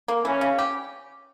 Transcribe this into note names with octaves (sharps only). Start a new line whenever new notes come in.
A#3
E3 C#4
C#3
G4